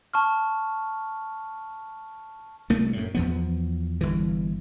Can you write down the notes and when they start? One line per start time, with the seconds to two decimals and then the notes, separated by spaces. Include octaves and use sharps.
0.14 A5 C#6 F6
2.70 C2 A3 A#3
2.93 F#2 A2
3.15 E2 F3 B3
4.01 G1 E3